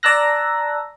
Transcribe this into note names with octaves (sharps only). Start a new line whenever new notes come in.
D5 A5 A#5 E6 F#6 A#6